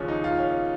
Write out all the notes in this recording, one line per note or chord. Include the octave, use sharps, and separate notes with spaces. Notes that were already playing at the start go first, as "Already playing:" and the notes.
Already playing: D#2 C#3 F3 C#4
D#4
F4
C#4